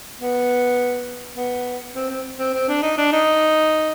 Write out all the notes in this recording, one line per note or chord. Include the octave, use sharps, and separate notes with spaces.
B3
B3
C4
C4
C4
C4
D4
D#4
D4
D#4